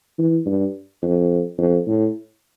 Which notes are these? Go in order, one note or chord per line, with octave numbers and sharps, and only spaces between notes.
E3
G2
F2
F2
A2